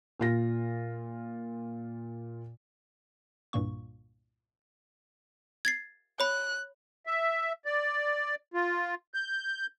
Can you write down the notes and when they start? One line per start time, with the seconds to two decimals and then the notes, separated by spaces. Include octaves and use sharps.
0.20 A#2 F4 A#6
3.53 G1 C2 G2 A#2 A#3 C#6
5.65 G#6 A6 C7
6.20 C#5 B5 F#6
7.07 E5
7.65 D5
8.54 F4
9.14 G6